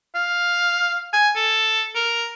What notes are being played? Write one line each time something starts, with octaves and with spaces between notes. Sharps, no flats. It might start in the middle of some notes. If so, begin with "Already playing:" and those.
F5
G#5
A4
A#4